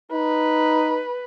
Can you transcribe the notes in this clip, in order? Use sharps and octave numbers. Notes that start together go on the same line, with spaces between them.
D#4 B4